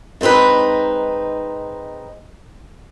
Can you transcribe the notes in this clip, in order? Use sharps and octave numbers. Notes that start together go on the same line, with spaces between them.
G#2 B3 C4 D#4 B4